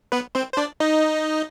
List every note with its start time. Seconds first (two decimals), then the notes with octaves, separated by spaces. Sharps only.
0.12 B3 B4
0.35 C4 C5
0.54 C5
0.57 D4 D5
0.80 D#4 D#5